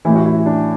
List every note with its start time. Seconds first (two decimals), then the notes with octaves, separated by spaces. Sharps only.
0.05 A1 A2 E3 E4
0.16 F#4
0.26 E4
0.46 D4